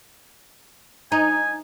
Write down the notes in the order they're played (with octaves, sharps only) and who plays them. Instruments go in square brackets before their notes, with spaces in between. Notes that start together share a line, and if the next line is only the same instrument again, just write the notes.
[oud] D#4 [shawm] G#5